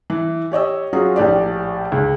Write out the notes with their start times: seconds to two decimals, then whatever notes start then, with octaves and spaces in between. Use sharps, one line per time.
0.10 E3
0.52 G4 C#5 D#5 E6
0.93 F#3 C#4 F4 F#4 G#4
1.16 A#1 A2 G4 D5
1.92 C#2